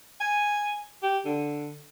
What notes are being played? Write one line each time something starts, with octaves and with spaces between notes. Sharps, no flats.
G#5
G4
D3